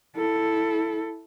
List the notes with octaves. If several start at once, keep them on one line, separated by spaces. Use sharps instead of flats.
E4 A4